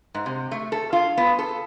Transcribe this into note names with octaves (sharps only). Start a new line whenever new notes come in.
G#2
C3
A3
A4
F4
B3
A4